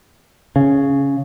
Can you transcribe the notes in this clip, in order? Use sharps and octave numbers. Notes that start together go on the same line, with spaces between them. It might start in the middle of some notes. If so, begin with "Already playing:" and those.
C#3